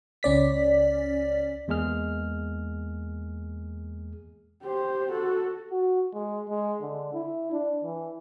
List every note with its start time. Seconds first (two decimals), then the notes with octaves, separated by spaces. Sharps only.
0.23 C#2 C#4 D5 B6
1.68 E2 G#3 A#3 G#4 F6
4.63 G4 C5
5.12 F#4 A4
5.71 F#4
6.14 G#3
6.49 G#3
6.82 D3
7.14 E4
7.52 D4
7.84 E3